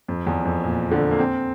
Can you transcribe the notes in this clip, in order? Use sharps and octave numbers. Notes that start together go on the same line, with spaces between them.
F2
E2
F2
A#2
D3
A#3
C4